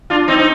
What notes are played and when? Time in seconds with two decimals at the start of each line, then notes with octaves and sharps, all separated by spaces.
0.10 D4 F4
0.28 C4 D#4
0.38 D#4